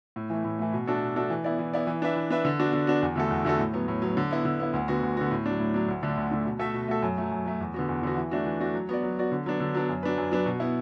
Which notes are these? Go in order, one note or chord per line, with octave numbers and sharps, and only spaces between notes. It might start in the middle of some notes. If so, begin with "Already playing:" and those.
A2
E3 A3
A2
E3 A3
B2
A3 D4 F#4 A4
B2
A3 D4 F#4 A4
E3
B3 E4 D5
E3
B3 E4 D5
E3
D4 B4 E5
E3
D4 B4 E5
D3
B3 D4 F#4
D3
B3 D4 F#4
E2
D3 A3 F#4 A4
E2
D3 A3 F#4 A4
A2
F#3 B3
A2
F#3 B3
D3
B3 E4
D3
B3 E4
D2
D3 B3 F#4
D2
D3 B3 F#4
A2
F#3 D4
A2
F#3 D4
D2
D3 A3 D4
D2
D3 A3 D4
B2
A3 F#4 A4 E5
B2
A3 F#4 A4 E5
F#2
F#3 A3
F#2
F#3 A3
E2
D3 B3 F#4
E2
D3 B3 F#4
E3
A3 D4 F#4
E3
A3 D4 F#4
F#3
B3 F#4 D5
F#3
B3 F#4 D5
D3
F#3 B3 D4
D3
F#3 B3 D4
F#2
F#3 D4 B4
F#2
F#3 D4 B4
B2
B3 E4